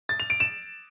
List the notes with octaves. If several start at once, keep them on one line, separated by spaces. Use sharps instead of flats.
A6
F7
D7
E7